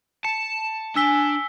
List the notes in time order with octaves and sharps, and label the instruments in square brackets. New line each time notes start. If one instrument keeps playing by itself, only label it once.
[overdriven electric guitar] A5 [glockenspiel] C#7
[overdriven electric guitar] D4 [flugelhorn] G#5 [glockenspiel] E6 B6 G7